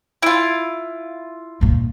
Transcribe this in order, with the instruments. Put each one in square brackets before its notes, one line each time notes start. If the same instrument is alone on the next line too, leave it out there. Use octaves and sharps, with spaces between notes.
[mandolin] E4 F4
[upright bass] D#2 A#2